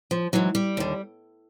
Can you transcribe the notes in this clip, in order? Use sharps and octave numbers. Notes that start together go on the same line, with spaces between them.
F3
G#2 E3 F#3
G3
D#2 D3